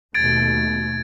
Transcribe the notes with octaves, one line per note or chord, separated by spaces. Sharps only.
D#2 B2 A3 G#6 A6 D7